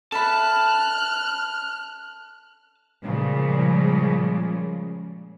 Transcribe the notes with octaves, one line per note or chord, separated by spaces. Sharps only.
A4 E5 A5 B5 F6 F#6
A#2 C#3 F3 G3 G#3